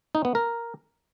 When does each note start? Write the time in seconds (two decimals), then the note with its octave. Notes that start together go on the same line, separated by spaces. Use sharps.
0.15 D#4
0.25 B3
0.35 A#4